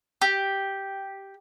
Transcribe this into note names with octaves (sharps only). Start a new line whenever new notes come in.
G4